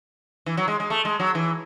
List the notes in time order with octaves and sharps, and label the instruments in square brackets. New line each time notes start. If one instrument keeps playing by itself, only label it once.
[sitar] E3
F#3
G#3
G#3
A3
G#3
F#3
E3